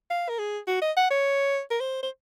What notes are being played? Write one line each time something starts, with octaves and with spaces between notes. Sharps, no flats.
F5
A#4
G#4
F#4
D#5
F#5
C#5
A#4
C5
C5